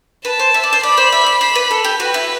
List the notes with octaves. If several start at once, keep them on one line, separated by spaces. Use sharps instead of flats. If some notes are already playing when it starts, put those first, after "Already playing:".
B4 A5
C5
E5
D5
C5
D5 B5
C5
E5
D5
C5 B5
B4
A4
G4
F#4 B4
E4